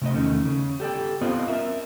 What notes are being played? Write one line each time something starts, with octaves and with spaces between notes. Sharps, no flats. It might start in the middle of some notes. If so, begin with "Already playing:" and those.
C3 A3 D#5
E2 B2 D#3 A3 C#4
C#3
G4 A4 D5 G5
B3 C4 F4 C5 D5 D#5
A#4 E5